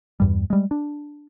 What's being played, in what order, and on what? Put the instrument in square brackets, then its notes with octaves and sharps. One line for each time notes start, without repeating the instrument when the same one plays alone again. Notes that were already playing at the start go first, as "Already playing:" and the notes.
[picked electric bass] E2 G2 G3
G3 G#3
D4